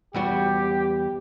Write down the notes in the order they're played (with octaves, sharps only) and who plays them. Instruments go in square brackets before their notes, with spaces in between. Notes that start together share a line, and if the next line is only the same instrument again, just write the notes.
[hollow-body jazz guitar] E2 G3 F#4 [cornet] G4